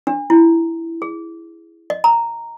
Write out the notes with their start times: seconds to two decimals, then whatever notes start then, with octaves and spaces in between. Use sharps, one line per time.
0.07 D4
0.30 E4
1.02 G#4
1.90 D#5
2.04 A#5